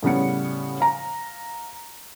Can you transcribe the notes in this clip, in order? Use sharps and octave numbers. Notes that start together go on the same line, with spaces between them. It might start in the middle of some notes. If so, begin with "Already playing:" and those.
A2 C#3 G3 B3 C#7
F5 A#5